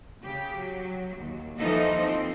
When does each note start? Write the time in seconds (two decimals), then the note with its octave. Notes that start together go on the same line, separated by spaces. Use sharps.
0.23 C#3 G4
0.56 F#3
1.18 D#2
1.59 D#2 E3 F3 D#4 A4 D#5
2.00 C4